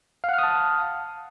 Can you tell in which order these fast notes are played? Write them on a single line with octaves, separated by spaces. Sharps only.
F5 F#5 F6 D#6 A5